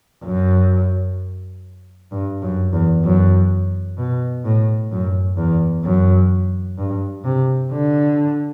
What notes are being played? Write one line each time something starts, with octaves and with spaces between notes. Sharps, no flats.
F#2
G2
F#2
E2
F#2
B2
A2
F#2
E2
F#2
G2
C3
D3